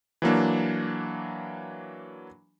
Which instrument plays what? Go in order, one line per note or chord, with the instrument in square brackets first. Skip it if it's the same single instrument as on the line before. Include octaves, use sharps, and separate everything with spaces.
[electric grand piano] E3 F#3 A#3 D4